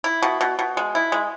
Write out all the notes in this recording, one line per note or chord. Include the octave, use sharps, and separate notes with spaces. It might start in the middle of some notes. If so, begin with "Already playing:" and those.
E4
B2
B2
B2
G#3
E4
G#3